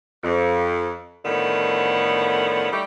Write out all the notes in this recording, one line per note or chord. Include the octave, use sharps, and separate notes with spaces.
F2
A2 D3 D#3 F3 B3
G3 A3 D#4 G4